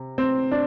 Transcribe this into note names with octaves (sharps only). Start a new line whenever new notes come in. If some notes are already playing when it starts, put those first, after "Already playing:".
Already playing: C3
C4
D4